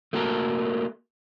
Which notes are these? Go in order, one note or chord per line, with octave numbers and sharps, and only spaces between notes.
A3 A#3 F#4 A4 A#4